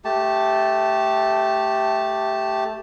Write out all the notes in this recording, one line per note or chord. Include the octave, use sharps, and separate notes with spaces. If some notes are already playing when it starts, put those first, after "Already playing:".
A3 G4 A5